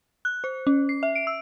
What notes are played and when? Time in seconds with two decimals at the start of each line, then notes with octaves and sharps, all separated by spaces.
0.25 F#6
0.44 C5
0.67 C#4
0.89 C7
1.03 E5
1.16 D7
1.27 E6